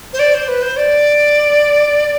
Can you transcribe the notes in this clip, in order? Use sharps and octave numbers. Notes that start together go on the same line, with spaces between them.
C5
D5
C5
B4
C5
D5